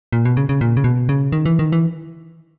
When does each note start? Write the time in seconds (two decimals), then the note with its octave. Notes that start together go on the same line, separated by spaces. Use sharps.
0.12 A#2
0.25 B2
0.37 C#3
0.49 C#3
0.61 A#2
0.77 C#3
0.84 B2
1.09 C#3
1.32 D#3
1.45 E3
1.59 D#3
1.72 E3